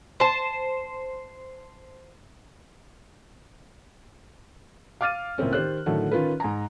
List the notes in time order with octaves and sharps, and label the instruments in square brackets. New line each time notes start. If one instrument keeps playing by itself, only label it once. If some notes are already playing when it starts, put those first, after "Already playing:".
[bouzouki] C5 A5
[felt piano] F5 D6 F6 A6 D#7
C#2 A2 A#3 C4 C#4
D#3 G4 C5 F#6
A2 D3 D#3 F#3 A3 F#4
D#3 C#4 F4 A#4 B4
G#2 G#5 A#5